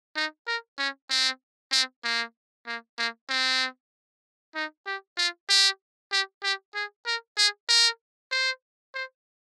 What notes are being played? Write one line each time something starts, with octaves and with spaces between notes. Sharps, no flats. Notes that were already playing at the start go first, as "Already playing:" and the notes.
D#4
A#4
C#4
C4
C4
A#3
A#3
A#3
C4
D#4
G4
F4
G4
G4
G4
G#4
A#4
G#4
A#4
C5
C5